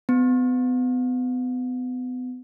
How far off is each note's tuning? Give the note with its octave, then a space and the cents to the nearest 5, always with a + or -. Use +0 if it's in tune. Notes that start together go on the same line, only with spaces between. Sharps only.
B3 +35